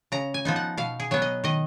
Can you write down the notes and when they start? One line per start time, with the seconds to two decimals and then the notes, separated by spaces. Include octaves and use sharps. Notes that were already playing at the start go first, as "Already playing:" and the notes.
0.12 C#3 A#5
0.34 G#5
0.45 F3 B3 D#4
0.56 F#5
0.78 B2 F5
1.00 G#4
1.11 F#3 B3 C#5
1.22 D#5
1.44 D#3 D#5